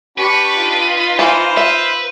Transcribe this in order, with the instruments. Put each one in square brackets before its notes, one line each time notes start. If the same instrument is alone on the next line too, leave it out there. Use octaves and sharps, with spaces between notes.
[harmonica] D4 G4 [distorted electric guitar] B4 [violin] B5 C#6
[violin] D#4 F4
[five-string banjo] E3 [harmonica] C5 F5 B5
[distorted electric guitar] B4 [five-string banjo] E5